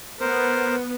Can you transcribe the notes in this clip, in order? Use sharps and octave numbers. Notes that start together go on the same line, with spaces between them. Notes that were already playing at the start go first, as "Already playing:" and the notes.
B3 A#4 C5